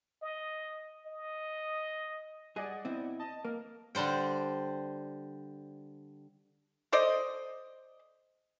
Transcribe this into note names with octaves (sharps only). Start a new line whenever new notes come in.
D#5
D#5
G2 G#4 D5 D#5 F#5
B2 C4 E4
D#5 A5
A#3 A#4
D3 G3 D4 C5 G5
A4 C5 D5 D#5